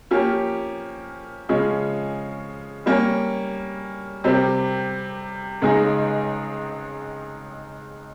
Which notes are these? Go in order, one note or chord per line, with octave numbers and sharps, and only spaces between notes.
F3 A#3 C#4 G4
C#3 F3 G#3 C#4 G#4
G3 A#3 C#4
C3 G3 C4 G4 A#4
C#2 C#3 G#3 D#4 G#4